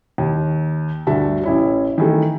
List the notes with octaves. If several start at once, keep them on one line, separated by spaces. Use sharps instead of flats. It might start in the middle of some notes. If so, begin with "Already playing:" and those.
D#2
D2 G2 D3 F#4 E5 A5
A1 E4 C#5
D#3 E3 A3